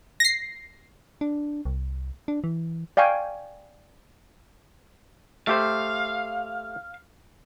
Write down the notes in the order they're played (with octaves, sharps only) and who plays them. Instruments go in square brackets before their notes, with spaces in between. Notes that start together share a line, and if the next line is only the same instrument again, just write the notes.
[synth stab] A#6 C7
[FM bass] D4
C2
D4
E3
[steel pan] D5 F5 G5 G#5 C#6
[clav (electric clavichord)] A3 G4 C5 [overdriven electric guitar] F5